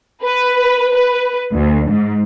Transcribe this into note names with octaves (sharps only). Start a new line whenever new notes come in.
B4
B4
D2
G#2